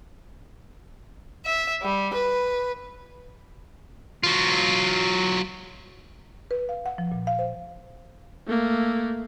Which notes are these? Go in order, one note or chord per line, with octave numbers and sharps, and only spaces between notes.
E5
G3
B4
F#3 F4
B4
F5
F#5
F3
A#2
F5
C5
A3 A#3